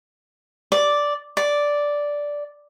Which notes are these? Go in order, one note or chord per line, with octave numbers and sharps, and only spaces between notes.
D5
D5